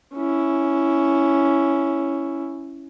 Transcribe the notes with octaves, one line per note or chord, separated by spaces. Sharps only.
C#4 E4